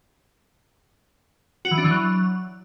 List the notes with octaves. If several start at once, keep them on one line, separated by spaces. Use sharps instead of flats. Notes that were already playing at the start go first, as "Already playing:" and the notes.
F#4
E3
D4
E3
F#3